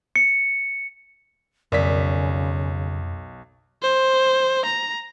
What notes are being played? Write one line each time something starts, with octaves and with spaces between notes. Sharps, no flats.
C#7
B1 F2 C#3 A#4 D5 B6
C5
A#5